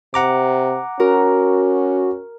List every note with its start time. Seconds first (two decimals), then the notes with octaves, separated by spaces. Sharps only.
0.14 C3 F#5 A#5 D6
1.00 C#4 F#4 A#4